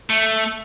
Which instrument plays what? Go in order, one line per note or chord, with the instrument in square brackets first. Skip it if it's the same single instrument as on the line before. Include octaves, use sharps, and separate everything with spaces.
[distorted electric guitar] A3